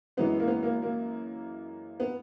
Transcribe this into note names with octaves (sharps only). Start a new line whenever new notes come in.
F#2 E3 G#3 B3
A#3
B3
A#3
A#3
B3